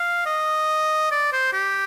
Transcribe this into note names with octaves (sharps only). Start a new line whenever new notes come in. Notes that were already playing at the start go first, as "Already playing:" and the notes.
Already playing: F5
D#5
D5
C5
G4